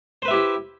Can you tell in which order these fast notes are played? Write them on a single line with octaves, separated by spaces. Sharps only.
C5 B4 E5 G4 E4